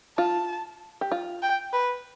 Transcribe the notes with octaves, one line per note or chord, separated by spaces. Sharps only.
F4 A5
G4
F4
G5
B4